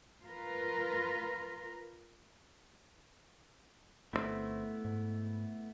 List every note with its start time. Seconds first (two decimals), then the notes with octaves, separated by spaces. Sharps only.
0.23 F4 A#4 B4
4.13 G1 D3 A3 B3 C4 E4
4.85 G#2